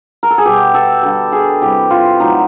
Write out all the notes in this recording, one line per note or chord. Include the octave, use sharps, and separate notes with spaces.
A#4
A4
G#4
B2 G3 G4
A4
D3 G3 A4
G#4
C3 E3 G3 G4
F4
A2 F#3 A3 D#4